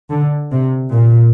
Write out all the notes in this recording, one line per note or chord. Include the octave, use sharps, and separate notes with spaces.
D3
C3
A#2